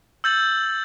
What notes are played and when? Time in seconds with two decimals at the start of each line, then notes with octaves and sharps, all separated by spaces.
0.24 E6 G6 A6 F#7